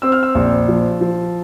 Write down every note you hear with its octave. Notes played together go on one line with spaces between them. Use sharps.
C4 E6
F6
E6
A#1
F3
F3